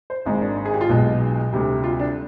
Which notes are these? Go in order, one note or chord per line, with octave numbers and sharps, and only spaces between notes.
C5
G#1 G#2 D#3 G#3 D#4
D4
G#4
G4
F4
B1 B2 G#3 D#4
D2 C3 G3
F4
D4